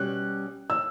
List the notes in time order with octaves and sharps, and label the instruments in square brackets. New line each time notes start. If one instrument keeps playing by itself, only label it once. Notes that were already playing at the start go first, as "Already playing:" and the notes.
Already playing: [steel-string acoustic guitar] B2 G3 C#4 [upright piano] F#6
[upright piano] E6